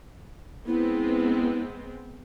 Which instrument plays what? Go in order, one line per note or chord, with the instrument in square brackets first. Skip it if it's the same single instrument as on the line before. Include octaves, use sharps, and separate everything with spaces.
[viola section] G#3 B3 C4 [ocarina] E4